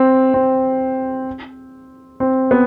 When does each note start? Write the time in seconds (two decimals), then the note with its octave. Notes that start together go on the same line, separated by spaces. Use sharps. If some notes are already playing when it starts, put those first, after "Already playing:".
Already playing: C4
0.34 C4
2.20 C4
2.51 B3